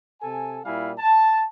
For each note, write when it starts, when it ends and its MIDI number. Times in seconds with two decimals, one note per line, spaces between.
0.21 0.59 48
0.21 0.59 69
0.21 0.59 80
0.65 0.92 46
0.65 0.92 55
0.65 0.92 64
0.65 0.92 77
0.65 0.92 80
0.99 1.45 81